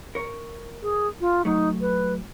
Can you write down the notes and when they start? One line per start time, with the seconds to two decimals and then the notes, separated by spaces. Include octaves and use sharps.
0.15 A#4 C#5
0.83 G#4
1.21 F4
1.45 F#3 A3 D#4
1.81 B4